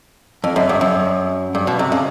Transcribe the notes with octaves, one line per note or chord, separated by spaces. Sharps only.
F2
F#2
G2
F#2
G2
B2
C3
C#3